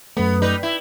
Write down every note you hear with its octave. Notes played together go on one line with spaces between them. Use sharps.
F#2 A3 B3
G3 D#4 B4
E4